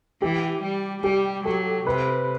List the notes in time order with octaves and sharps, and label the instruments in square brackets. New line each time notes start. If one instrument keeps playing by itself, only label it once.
[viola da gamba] E3 [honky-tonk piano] G4
[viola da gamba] G3
[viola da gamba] G3 [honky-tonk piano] G4
[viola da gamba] F#3 [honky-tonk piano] A4
[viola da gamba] C3 [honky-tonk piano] B4